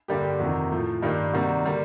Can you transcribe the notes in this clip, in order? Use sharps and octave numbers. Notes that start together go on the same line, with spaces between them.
G2 D3 G3 A#3 G4
G4
F2 C3 D#3 F#4
A2 F3 A3
G2 D#3 G3 A#3
C3 D#3 G3 A#3 F#4
D3 G3 A#3